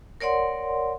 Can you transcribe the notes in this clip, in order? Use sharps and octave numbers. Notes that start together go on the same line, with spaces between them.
A#4 C#5 D5 F#5 C6